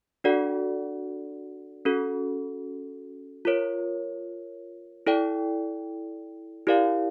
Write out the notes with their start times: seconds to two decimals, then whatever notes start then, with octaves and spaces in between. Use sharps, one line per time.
0.24 D4 F#4 A4 D5 F#5
1.85 C#4 F#4 A4
3.45 F4 A#4 C#5
5.07 E4 A4 D5 G5
6.67 E4 G4 A#4 D5 F5